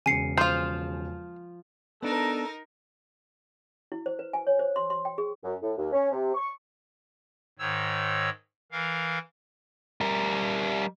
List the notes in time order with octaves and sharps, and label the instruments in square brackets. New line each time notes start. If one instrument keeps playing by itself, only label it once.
[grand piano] E1 C#3 [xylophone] G#5 C7 C#7
[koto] F3 F4 [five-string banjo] C5 F5
[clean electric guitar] B3 D4 [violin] D#4 A#4 [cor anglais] A4
[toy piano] E4
C5
B4
G#5
C#5
C5
C6
C6
G5
G#4
[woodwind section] F#2
A2
D#2
C#4
C3
C#6
[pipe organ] G#2 D#3 C#5 E6
E3 A#4 F5
[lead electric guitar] G3 A#4